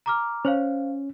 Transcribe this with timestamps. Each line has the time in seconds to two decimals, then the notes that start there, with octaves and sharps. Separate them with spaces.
0.06 A#5 D6 F6
0.45 C#4 C5 C#5 F5